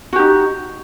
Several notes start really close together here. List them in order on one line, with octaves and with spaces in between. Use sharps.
F#4 G4 D#4